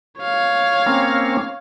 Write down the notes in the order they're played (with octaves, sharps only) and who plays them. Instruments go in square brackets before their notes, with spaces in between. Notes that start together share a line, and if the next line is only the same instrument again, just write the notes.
[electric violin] C#5 F5
[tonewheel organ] A#3 C4 C#4